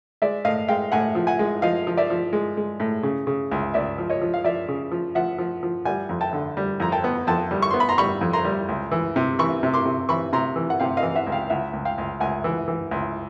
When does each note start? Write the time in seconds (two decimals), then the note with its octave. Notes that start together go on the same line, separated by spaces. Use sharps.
0.22 G#3 D5 E5
0.45 A2 D#5 F5
0.68 G#3 F5 G5
0.92 A2 F#5 G#5
1.15 F3
1.27 F#5 G#5
1.39 G#3
1.62 F3 D#5 F5
1.87 F3
1.97 D5 E5
2.10 F3
2.33 G#3
2.57 G#3
2.80 A2
3.03 C#3
3.27 C#3
3.51 C#2
3.74 C#2 D5 E5
3.98 F3
4.09 C#5 D#5
4.21 F3
4.34 F5
4.44 F3 D5 E5
4.68 C#3
4.91 F3
5.15 F3 E5 F#5
5.38 F3
5.63 F3
5.85 G3 F#5 G#5
6.09 F2
6.21 G5 A5
6.33 D3
6.57 G3
6.80 F2 A#5
6.92 G5 A5
7.04 B3
7.27 F2 G5 A5
7.51 G3
7.62 C#6
7.71 B3 C6
7.80 B5
7.89 A#5 C6
7.98 G3 B5 C#6
8.21 F2
8.33 A#5 C6
8.44 G3
8.69 C#2
8.91 E3
9.16 C3
9.39 E3 B5 C#6
9.63 C3
9.73 C6 D6
9.85 C3
10.09 E3 B5 C#6
10.33 C3 A#5 C6
10.56 E3
10.70 F#5
10.80 C3 F5 G5
10.97 D#5 F5
11.03 E3
11.15 E5 F#5
11.27 C#2
11.32 F5 G5
11.50 C#2 E5 F#5
11.73 C#2
11.85 F5 G5
11.98 C#2
12.20 C#2 F#5 G#5
12.44 E3
12.68 E3
12.91 C#2